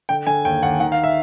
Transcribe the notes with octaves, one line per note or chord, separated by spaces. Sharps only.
D3 G5
D3 G#5
D#2 G5
D#2 F#5
D#3 F#5
F5
E5